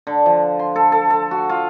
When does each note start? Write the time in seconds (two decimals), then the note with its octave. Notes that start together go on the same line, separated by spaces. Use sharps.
0.07 D3
0.26 F3
0.59 C6
0.76 A4
0.92 A4
1.10 A4
1.31 F#4
1.49 F4